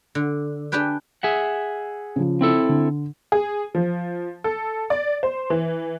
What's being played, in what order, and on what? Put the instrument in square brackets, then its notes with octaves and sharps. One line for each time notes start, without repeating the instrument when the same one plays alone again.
[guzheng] D3
D4 G4 G#4 B4 G5
[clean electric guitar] G#4 E5 F#5
[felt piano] C#3 F3
[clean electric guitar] C4 E4 A4
[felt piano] D3
[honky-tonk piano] G#4
F3
A4
D5
C5
E3